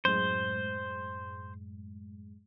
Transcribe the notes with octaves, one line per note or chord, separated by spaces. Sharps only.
F#2 A2 G#3 C5